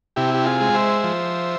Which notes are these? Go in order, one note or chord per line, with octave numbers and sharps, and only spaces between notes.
C3 E4 G4
G4
F4 G#4
G#3
C5 E5
F3